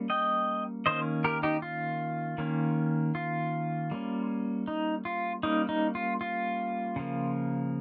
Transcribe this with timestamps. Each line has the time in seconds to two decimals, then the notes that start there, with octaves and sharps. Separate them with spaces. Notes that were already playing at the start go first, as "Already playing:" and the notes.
Already playing: G3 A#3 C#4
0.10 D#5 G5
0.86 D#3 A#3 C#4 C5 D#5
1.24 G4 A#4
1.43 D#4 G4
1.62 F4
2.38 D#3 A#3 C#4
3.15 F4
3.91 G3 A#3 C#4
4.68 D#4
5.05 F4
5.43 G3 A#3 C#4 D#4
5.69 D#4
5.95 F4
6.21 F4
6.96 C#3 F3 A#3